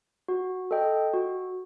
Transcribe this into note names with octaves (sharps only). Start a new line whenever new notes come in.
F#4
A4 D#5 G5
F#4